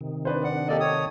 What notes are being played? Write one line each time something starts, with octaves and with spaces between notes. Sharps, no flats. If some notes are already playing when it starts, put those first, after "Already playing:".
C3 D#3
D4 B4 C5
D4 F#5
A#3 G4 A4 D5 D#5
C#5 D#6